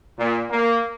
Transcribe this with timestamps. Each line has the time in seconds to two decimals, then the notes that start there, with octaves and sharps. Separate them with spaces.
0.18 A#2
0.50 A#3